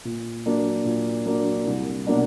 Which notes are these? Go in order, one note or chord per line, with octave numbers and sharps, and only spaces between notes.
A#2
F#3 A#3 D4
A#2
F#3 A#3 D4
C2
B2 F#3 A#3 D4